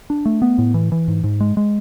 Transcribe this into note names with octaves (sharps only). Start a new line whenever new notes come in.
D4
A3
B3
A2
E3
E3
G#2
G#2
G#3
G#3